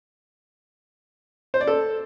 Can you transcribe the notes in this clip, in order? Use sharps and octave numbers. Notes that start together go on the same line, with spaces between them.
C5
D5
A4